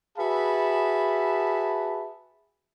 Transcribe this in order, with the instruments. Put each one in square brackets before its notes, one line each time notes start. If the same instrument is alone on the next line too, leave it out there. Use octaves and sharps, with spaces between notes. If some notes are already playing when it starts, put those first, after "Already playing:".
[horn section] F#4 G#4 B4 E5 A5 B5